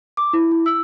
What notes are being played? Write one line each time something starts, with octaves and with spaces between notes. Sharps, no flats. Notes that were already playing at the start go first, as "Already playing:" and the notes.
D6
E4
E4
E6